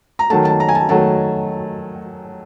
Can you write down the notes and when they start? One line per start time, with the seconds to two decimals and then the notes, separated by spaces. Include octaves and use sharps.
0.19 A#5
0.30 D#3 F#3 A3 A5
0.45 A5
0.60 A#5
0.68 G#5
0.75 A5
0.89 D#3 F#3 A3 A5